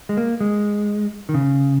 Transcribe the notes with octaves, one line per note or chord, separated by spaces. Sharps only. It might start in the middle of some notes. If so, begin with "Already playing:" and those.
G#3
A#3
G#3
D#3
C#3